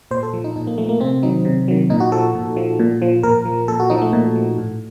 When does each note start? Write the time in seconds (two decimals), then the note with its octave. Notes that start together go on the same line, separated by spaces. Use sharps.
0.11 A#2 C5
0.23 A4
0.33 F3
0.44 D#4
0.56 A#2 D#4
0.67 A#3
0.78 F3 A3
0.89 A#3
1.00 C3 C4
1.23 D#3 F#3 D#4
1.45 C3
1.68 D#3 F#3
1.90 A#2 D#4
2.00 F#4
2.12 F3 A4
2.35 A#2
2.57 F3
2.80 A#2
3.02 F3
3.23 A#2 A#4
3.45 F3
3.68 A#2 A4
3.80 F#4
3.90 F3 D#4
4.02 A3
4.13 A#2
4.36 F3
4.58 A2